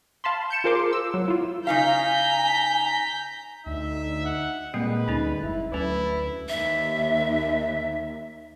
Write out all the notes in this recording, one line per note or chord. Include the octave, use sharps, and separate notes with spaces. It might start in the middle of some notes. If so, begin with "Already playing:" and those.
F5 A5 B5 C6
G6 C#7 E7
F4 G#4 A#4 C5 C6 D6
E6
F#3
E4 F4
C#3 D#4 F5 G#5 A#5 G6 B6
D2 D#4 E5
F#5
A#2 G3 G#3 A#3 C4 B4
D2 C#4 D#4
F#1 E4
D2 F#3 A3 C#4 E4 B4
D#2 E5